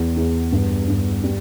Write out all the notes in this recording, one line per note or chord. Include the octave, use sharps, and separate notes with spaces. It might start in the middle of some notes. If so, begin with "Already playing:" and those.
Already playing: E2
E2
G2
G2
G3